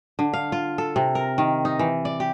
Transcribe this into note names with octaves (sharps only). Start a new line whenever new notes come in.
D3
F5
F4
A4
C3
A#4
D#3
D#4
E3
D5
G4